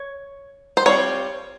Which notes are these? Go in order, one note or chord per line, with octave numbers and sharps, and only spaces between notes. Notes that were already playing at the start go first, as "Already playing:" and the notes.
Already playing: C#5
C5
G3 C4 F4 C#5